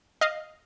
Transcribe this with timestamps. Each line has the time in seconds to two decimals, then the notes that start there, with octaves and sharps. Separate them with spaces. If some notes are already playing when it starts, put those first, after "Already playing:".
0.21 D#5 F5